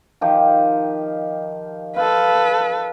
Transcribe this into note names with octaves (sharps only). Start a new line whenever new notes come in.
D#3 F3 G4
F4 A4 B4